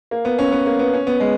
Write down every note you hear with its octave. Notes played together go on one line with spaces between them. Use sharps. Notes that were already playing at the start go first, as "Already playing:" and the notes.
A#3
B3
C#4
B3
A#3
B3
C#4
B3
G#3